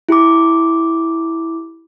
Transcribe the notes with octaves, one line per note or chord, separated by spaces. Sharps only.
E4 G4 B5 D6